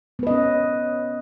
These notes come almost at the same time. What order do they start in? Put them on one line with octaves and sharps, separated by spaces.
B3 B4 D#5 C#4